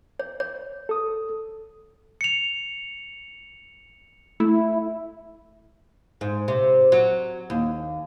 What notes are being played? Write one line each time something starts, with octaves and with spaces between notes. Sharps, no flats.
C#5
C#5
A4 D#6
C#7 F7
A3 E4
G#2
C3
F#3
D#2